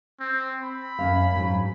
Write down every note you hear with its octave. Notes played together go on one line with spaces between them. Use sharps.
C4
B5
F#2 C#4 F5
G#2 F#3